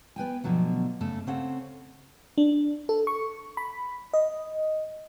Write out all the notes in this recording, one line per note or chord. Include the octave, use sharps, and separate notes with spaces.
B3 B4 G5 G#5
B2 D3 F3 F#3 A3
F#2 C#3 A3 A4
C#3 C4 C#4 A4 F5 F#5
D4
A4
C#6
B5
D#5